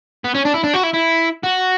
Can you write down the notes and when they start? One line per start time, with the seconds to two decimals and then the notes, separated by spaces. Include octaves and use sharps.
0.24 B3
0.34 C#4
0.45 D4
0.54 E4
0.64 D4
0.74 F#4
0.84 E4
0.94 E4
1.44 F#4